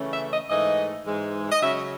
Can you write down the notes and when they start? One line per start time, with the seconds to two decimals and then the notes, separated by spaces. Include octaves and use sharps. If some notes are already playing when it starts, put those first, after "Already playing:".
Already playing: C#3 E3 A3 C#4
0.12 E5
0.31 D#5
0.50 G#2 E3 A3 D#5
1.06 G#2 E3 G#3
1.51 D#5
1.62 C#3 F#3 C#4 E5